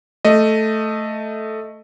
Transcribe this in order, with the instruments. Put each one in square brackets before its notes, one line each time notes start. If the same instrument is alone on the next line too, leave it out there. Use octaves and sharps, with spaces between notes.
[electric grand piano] A3 D#5